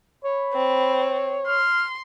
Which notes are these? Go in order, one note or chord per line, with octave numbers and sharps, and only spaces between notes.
C#5 B5
C4
C6 F6